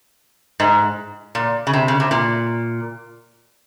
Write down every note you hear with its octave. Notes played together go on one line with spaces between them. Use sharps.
G#2
A#2
C#3
C3
C#3
C3
A#2